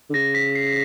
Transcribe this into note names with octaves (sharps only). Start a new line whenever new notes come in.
D3
C#3 A#6
B6
C7